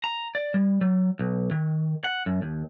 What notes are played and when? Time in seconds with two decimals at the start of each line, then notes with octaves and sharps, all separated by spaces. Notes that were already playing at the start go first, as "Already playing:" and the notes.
0.04 A#5
0.35 D5
0.54 G3
0.81 F#3
1.19 B1
1.51 D#3
2.04 F#5
2.26 F#2
2.42 D#2